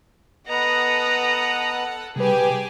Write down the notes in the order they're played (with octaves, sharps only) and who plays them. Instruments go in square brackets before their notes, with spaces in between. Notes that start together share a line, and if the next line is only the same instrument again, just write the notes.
[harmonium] B3 B4 D#5 [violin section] A4 F#5 [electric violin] A#5 D#6
[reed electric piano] C3 G3 B4 [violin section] G4 G#5 [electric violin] G#4